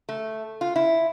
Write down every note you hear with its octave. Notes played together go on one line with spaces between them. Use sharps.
A3
F4
E4